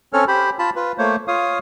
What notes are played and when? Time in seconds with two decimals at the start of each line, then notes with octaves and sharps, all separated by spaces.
0.13 C4 C#4 A4 C#5 F6
0.28 G4 C5 B5
0.59 F4 A5 B5
0.76 F4 B4
0.98 A3 A#3 C5 C#5
1.28 F4 C#5 F5 D#6